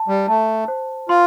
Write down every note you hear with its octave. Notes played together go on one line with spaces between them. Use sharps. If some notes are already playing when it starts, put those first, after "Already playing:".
Already playing: A5
G3
A3 A5
C5
F4 C6